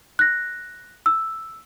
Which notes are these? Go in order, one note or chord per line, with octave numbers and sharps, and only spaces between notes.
F#6 A#6
E6